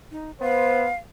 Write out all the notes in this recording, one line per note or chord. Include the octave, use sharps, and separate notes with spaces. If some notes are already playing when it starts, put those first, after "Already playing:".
D#4
B3 C5 F5